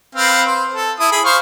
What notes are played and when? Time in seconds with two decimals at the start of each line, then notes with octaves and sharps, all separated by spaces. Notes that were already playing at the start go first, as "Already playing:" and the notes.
0.15 C4 B4 F5
0.47 C5
0.74 A4
1.00 E4 D#6
1.12 G#4 B5
1.25 C5 F5 C#6